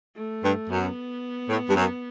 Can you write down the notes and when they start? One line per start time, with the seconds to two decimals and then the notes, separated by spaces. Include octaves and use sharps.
0.16 A3
0.44 G2
0.70 F#2 B3
1.49 A2
1.69 G2
1.76 F#2